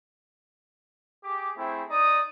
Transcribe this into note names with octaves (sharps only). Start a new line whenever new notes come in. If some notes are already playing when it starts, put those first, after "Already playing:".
G4 G#4 D6
A3 C4 E4 G#4 G5
D#4 D5 D#6